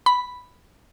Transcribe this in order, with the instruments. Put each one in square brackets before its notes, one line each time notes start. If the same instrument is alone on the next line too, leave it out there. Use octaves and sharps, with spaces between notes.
[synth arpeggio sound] B5